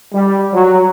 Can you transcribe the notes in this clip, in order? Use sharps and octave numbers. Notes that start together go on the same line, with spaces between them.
G3
F#3